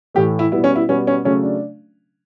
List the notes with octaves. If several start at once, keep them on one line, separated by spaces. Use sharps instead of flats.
A2 E3 A3 G4
E4
B2 G3 B3 E4
C#4
E4
B2 G3 B3 C#4
C#4
C#3 F#3 A3 C#4
D4